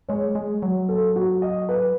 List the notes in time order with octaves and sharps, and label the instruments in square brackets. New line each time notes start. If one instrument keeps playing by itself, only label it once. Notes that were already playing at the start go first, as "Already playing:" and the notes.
[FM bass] G#3 [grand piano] C#5
[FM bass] G#3
F#3
[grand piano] A4
F#4
D#5
B4